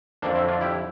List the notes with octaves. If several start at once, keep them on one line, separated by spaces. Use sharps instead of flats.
F2 D3 F3 A#3 D4
C4 E4
D4 F4
E4 G4